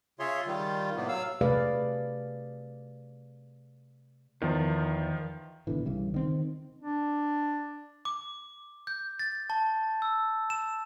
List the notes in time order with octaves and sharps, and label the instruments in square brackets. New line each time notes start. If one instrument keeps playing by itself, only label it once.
[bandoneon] C#3 F4 G#4 C#5 E5 C6
D#3 G3 F4
A2 C3 A#3 B3
F#3 F5 E6
[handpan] C3 A3 G#4 B4 D5 F5
[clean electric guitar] E2 [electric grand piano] D#3 F3
[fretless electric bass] G#1 B2 D3 E3
C2 C#3 E3 G3
D#3 C4
[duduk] D4
[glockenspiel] D6
G6
A6
A5
E6
E7